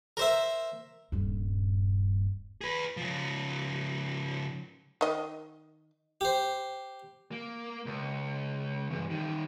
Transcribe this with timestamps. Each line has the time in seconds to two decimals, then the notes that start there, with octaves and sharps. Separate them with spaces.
0.17 A#4 C5 E5
1.12 D#1 G2
2.61 G#4 B4
2.97 C#3 F3
5.01 D#3 D#5
6.21 G4 C5
7.32 A#3
7.86 C#2
8.90 E2 G2
9.10 D#3 G3